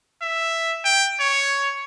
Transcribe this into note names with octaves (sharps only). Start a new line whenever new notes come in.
E5
G5
C#5